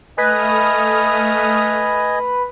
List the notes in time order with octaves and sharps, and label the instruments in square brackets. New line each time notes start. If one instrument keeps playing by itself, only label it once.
[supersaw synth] A3 D#6 F6 [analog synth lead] B4 [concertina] D#5 G#5